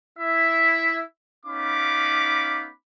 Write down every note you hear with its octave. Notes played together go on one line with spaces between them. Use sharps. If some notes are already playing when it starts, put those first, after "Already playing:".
E4 E5
B3 C#4 D#4 F5 B5 D6